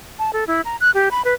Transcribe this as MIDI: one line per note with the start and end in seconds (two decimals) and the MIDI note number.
0.19 0.31 81
0.33 0.44 69
0.47 0.61 64
0.65 0.76 82
0.81 0.91 90
0.94 1.09 67
1.11 1.22 83
1.25 1.34 71